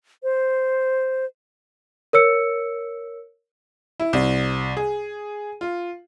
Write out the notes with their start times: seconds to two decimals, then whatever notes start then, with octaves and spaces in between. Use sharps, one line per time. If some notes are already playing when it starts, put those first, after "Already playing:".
0.23 C5
2.13 A#4 C#5 E6 C#7
4.00 E4
4.13 C2
4.77 G#4
5.61 F4